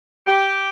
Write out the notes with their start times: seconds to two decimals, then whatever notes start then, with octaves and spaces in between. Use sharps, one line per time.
0.27 G4